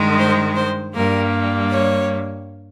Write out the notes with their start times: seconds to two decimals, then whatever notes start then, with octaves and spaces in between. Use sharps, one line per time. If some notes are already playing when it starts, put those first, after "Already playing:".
Already playing: G2 D#3 G#3
0.18 C5
0.56 C5
0.94 G2 G3 A#3 A#4
1.70 C#5